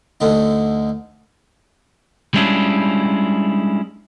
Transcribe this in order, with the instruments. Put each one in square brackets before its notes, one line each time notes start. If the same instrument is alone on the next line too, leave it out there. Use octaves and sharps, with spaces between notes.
[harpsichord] D2 D3 D#4
[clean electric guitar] G3 G#3 C#4 D4 E4 F4